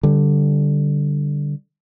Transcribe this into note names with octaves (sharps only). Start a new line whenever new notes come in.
D3 G3